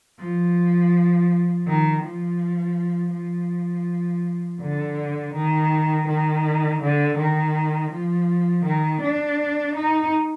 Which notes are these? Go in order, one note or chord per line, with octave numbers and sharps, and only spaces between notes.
F3
D#3
F3
F3
D3
D#3
D#3
D3
D#3
F3
D#3
D4
D#4